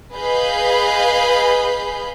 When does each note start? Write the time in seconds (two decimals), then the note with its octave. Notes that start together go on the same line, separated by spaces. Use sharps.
0.13 G#4 B4 D#5 F5 B5 G6